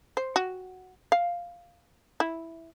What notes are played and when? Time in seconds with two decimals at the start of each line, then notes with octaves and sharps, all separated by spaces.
0.17 C5
0.36 F#4
1.12 F5
2.20 E4